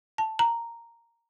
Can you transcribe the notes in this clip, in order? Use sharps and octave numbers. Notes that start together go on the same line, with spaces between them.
A5
A#5